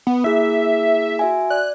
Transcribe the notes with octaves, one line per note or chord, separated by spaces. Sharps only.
B3
A#3 E4 G#4 E5
F#4 E5 G#5
D5 F#6